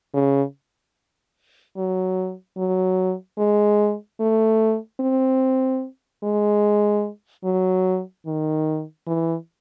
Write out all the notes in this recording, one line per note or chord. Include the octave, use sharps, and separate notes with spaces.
C#3
F#3
F#3
G#3
A3
C4
G#3
F#3
D#3
E3